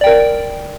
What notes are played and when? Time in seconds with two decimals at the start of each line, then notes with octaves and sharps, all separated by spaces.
0.01 D5
0.04 G5
0.06 A#4